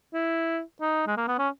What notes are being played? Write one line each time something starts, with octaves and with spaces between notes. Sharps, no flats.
E4
D#4
G#3
A#3
B3
C#4